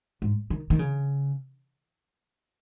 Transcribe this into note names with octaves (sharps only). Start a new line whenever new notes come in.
G#2
D#3
D#3
C#3